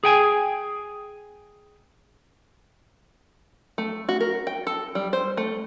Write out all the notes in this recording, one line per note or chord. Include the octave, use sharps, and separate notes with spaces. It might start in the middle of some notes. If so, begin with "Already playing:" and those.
G#4 G5 G#5
A3
F#4
A#4
G5
A4
G3
C5
A3